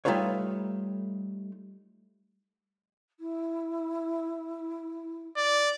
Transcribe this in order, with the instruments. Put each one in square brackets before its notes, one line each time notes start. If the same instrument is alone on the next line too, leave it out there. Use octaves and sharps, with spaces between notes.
[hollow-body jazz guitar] G3 A3 D#4 F4 B4 C#5
[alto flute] E4
[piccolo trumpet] D5